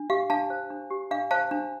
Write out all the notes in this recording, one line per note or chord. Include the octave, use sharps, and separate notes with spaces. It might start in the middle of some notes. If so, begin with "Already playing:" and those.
Already playing: D4
G4 F5
D4 F5 A5
C5
D4
G4
D4 F5
C5 F5 A5
D4